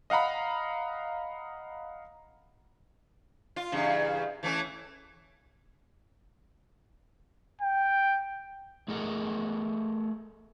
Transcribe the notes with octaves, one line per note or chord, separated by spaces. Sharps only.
D#5 F5 F#5 A#5 B5
F4
E2 G2 C#3
E3 A3 C#4
G5
A3 G#4 A#4 D#5 F#5